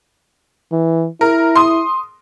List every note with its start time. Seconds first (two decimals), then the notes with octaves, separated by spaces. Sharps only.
0.72 E3
1.21 E4 A#4
1.56 C6 D#6